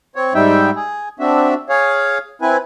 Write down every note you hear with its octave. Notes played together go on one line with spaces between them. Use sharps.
C4 C#5
G#2 G3 D#4 E5 G5
G#4
C4 D4 F#4 E5
G#4 C#5 F5
C4 E4 B4 G#5